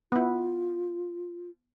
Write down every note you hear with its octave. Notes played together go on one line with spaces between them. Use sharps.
B3 E4 F4